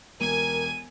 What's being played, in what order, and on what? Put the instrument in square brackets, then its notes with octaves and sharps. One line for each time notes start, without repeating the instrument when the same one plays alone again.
[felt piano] E1 [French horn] A#4 [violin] G#5 G#6 [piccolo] D#7